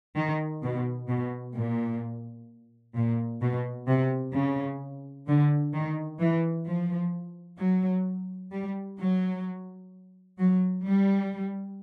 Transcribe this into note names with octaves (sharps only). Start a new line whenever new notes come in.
D#3
B2
B2
A#2
A#2
B2
C3
C#3
D3
D#3
E3
F3
F#3
G3
F#3
F#3
G3